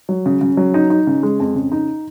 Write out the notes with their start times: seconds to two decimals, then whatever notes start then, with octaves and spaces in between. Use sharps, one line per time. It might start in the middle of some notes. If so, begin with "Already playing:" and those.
0.09 F#3
0.26 C#3
0.41 C#3
0.57 F#3
0.74 D#4
0.90 D#4
1.07 C#3
1.23 G#3
1.40 F2
1.55 C#3
1.72 D#4